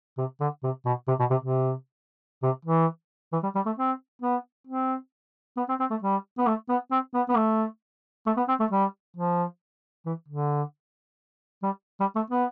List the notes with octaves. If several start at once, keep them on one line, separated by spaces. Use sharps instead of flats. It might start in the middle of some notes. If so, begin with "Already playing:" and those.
C3
D3
C3
B2
C3
B2
C3
C3
C3
E3
E3
G3
G3
A3
C4
B3
C4
B3
C4
C4
A3
G3
B3
A3
B3
C4
B3
B3
A3
A3
B3
C4
A3
G3
F3
E3
D3
G3
G3
A3
B3